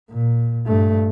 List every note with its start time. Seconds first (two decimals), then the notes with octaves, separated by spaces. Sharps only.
0.11 A#2
0.66 G2 A3